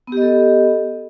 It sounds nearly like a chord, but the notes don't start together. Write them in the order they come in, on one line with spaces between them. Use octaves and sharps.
B3 G4 D#5 A4